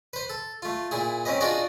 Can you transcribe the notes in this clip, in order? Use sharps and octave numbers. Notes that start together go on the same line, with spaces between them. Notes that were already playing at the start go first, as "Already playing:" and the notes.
B4 C5
A4
A3 F4
A#2 E4 G#4
C4 C#4 B4 D#5
D4 F4 F#4 G#4 D5 D#5